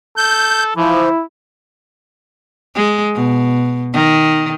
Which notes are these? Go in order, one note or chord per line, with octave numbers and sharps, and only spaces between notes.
A4 G6
E3 F3 E4
G#3
B2
D#3